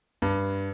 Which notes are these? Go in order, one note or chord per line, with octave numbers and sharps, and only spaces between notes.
G2